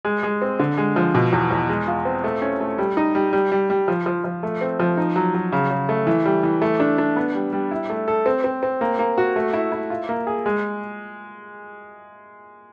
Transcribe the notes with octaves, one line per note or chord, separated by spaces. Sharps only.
G#3
G#3
C4
D3
G#3
F3
B2
E2
E2
G#3
F4
C4
A3
C#4
A3
G3
D#4
G3
G3
G3
G3
F3
F3
F3
A3
C4
F3
D#4
F#3
F#3
C#3
C#3
A3
E3
G3
E3
A3
D4
D4
B3
G3
G3
E4
A3
A4
C4
C4
C4
A#3
A#3
F#4
A3
E4
E4
F4
A#3
G#4
G#3